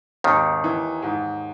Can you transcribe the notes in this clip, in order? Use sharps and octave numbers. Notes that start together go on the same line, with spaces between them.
G#1 D#2 D#3
E3
G#2